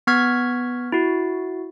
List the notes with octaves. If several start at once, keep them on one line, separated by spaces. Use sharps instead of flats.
B3 C#6 F6 G#6 B6
E4 F#4